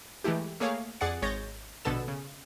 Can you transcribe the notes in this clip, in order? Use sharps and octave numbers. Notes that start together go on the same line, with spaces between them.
E3 G#3 A3 E4 G4
A3 A#3 G#4 C#5 F5
F2 G#4 D5 F#5 A6 C#7
G#1 G#3 C#5 G6 A6 A#6
A#1 B2 D3 B3 A4 E7
C#3